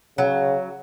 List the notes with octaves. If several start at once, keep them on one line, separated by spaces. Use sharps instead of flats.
C#3 F#3